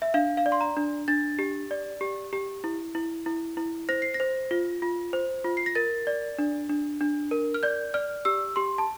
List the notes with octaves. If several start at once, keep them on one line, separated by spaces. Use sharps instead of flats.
E5
D4 F5
F5
D5
C6
A#5
D4
D4 A6
G4
D5
G4
G4
E4
E4
E4
E4
C5 A#6
C7
A#6
C5
F4
F4
C5
F4
C7
A#6
A#4 A6
D5
D4
D4
D4
A#4
F6
D5 G6
D5 F6
G4 E6
G4 C6
A5